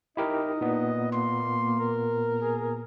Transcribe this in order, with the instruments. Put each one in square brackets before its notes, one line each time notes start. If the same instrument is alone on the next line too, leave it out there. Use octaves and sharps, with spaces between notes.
[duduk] D#4 [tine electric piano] E4 G4 A#4 [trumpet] D#5
[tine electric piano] A#2 B3
[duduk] A#3 [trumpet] C6
[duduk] A#4
[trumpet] G#4